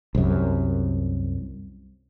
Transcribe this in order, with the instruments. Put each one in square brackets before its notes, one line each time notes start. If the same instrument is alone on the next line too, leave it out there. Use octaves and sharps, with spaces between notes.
[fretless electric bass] C2 F#2